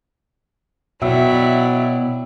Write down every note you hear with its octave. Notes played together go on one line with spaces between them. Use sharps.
B2 F#3 E4 D5 E5 G5 E6